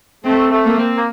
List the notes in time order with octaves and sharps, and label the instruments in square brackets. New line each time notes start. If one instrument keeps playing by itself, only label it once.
[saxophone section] A3 [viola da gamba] C4
[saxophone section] A3
[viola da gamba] A#3
[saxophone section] C4
A#3